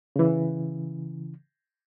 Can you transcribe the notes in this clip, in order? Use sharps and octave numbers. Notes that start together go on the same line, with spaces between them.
C#3 E3